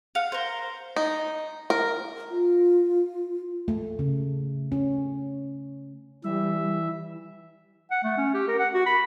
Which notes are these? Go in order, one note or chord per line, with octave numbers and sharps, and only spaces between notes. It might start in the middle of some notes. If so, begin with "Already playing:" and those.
F5 F#5
A#4 C5
D#4
A#4
F4
A3
C#3
C#4
E3 G3 E5
F#5
A3
C#4
G4
A#4
F#5
F#4
B5